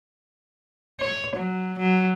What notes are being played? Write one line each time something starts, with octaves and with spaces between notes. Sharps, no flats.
C#5
F#3
F#3